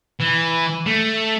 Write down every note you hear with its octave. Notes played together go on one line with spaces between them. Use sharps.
E3
A3